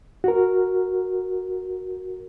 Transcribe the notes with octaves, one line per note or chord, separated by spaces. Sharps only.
F#4 A#4